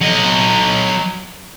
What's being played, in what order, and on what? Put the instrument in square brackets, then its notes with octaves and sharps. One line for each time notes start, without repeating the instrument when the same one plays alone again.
[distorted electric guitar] F#3 D#5